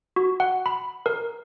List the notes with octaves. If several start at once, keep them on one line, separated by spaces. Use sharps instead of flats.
F#4
F#5
B5
A#4